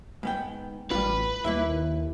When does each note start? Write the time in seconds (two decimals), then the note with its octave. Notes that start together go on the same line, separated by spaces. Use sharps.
0.23 G#2 B3 G5
0.91 A1 G3 F4 B4
1.44 D#2 A#3 E4 E5